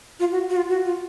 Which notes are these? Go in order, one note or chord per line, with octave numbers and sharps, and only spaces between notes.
F4
F#4
F#4
F4
F#4
F4